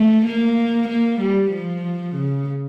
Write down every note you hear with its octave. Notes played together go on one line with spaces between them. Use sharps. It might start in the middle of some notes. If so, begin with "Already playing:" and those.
Already playing: A3
A#3
A#3
G3
F3
C#3